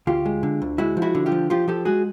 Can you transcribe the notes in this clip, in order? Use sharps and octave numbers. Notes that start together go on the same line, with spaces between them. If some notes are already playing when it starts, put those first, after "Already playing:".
D2 F4 G4
G#3
D3
D2
G#3 E4 F#4
F3
E4 F#4
D3
F4 G4
F3
F3 F4 G4
F3 G4 A4
G#3 F#4 G#4